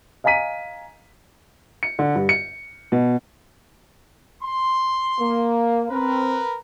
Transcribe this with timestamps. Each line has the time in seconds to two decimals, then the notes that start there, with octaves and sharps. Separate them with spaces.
0.24 D#5 F5 G#5 A#5 B6 D#7
1.83 C#7
1.99 D3
2.15 G2
2.29 C#7
2.92 B2
4.44 C6
5.19 A#3
5.90 C4 A#4 B4